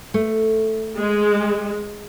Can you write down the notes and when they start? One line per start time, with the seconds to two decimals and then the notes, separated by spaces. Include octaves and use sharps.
0.14 A3
0.98 G#3